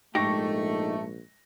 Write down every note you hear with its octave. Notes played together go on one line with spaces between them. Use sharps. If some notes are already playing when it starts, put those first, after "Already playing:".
A#1 G#2 A3 D#4 G4 C#6 A#6